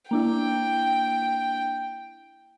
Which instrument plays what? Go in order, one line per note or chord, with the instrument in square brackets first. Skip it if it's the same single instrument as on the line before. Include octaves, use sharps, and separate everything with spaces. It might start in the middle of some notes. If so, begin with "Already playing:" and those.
[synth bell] A#3 D4 E4 [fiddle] G5